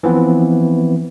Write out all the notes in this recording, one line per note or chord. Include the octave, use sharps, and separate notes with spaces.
E3 F3 B3 C4